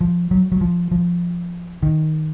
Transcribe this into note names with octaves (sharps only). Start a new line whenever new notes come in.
F3
F#3
F#3
F3
F3
D#3